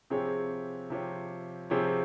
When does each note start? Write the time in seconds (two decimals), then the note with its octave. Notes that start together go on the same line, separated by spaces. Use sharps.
0.10 C3 F3 C4 G4 G#4 C#5
0.90 C3 F3 C4 G4 C#5
1.70 C3 F3 C4 G4 G#4 C#5